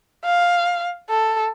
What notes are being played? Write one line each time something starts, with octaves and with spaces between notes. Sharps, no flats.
F5
A4